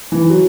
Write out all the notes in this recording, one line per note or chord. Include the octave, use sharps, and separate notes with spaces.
E3
F#3